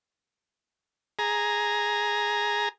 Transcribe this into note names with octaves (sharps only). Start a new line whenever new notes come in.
G#4 A#5